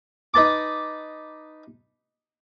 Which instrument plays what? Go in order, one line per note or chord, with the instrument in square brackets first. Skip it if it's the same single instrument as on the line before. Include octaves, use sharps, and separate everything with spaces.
[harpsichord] D#4 B4 A5 D6